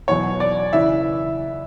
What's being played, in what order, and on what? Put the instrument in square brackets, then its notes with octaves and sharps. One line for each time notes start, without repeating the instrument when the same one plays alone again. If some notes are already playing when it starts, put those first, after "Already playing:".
[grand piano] E2 B2 F#3 C#5
D5
C#3 E3 E5